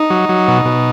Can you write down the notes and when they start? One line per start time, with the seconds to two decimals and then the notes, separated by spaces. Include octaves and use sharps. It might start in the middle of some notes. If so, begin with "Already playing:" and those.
Already playing: D#4
0.10 F#3
0.29 F#3
0.48 B2
0.65 B2